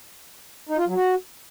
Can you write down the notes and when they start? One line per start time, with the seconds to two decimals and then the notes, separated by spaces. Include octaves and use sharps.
0.69 D#4
0.78 F4
0.86 F#3
0.95 F#4